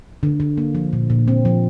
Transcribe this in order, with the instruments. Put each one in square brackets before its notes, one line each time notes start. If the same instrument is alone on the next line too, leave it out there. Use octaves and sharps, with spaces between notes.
[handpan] D3
D3
A#3
F3
A#2
A#2
C4
F3